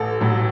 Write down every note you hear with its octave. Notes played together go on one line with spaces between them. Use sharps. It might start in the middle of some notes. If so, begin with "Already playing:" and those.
Already playing: A1 A4
A2 F#3